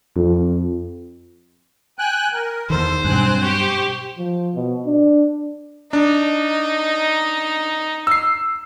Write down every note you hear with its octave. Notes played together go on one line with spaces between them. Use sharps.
F2
G5 G#5 F#6
A#4
E2 D#3 A4 C5
B1 G2 C4 G#5 F#6
G4 G5 C#6
F3
B2
D4
D4 D#4
E6 C7